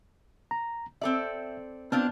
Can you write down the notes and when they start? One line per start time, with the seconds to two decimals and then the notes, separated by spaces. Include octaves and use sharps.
0.51 A#5
1.01 C4 A4 D5 E5
1.92 B3 C4 D4 F4 A5 F6